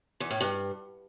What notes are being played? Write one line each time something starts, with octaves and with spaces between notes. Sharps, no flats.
E2
A2
G2